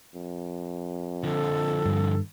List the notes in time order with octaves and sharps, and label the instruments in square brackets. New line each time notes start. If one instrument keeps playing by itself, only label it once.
[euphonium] F2
[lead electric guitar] D3 F3 [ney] A4
[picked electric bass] G2